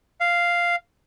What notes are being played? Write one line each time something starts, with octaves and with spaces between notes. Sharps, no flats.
F5